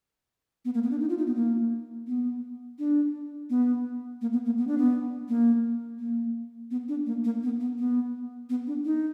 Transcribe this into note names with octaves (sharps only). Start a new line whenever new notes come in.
B3
A#3
B3
D4
D#4
F4
D#4
B3
A#3
B3
D4
B3
A#3
B3
A#3
B3
D4
B3
A#3
A#3
B3
D4
A#3
A#3
B3
B3
B3
B3
D4
D#4